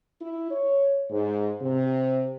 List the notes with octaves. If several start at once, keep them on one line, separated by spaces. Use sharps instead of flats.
E4
C#5
G#2
C3